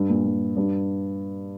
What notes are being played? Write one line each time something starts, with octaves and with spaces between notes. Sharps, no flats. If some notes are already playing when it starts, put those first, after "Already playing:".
Already playing: G2
A#2
A#2
G2